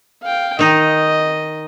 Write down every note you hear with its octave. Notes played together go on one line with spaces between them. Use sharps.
F5 G5
D#3 D#4 D#5